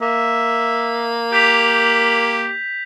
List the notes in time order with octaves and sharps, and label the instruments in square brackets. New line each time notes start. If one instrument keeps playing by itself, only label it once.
[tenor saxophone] A#3 [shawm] E5
[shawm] G4 [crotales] G6 B6 F7